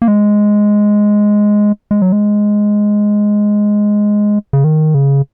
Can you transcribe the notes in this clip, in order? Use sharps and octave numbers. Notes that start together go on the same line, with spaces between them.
A#3
G#3
G#3
F#3
G#3
C#3
D#3
C#3